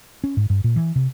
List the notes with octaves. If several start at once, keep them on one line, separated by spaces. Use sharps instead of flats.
C#4
G#2
G2
A#2
E3
C3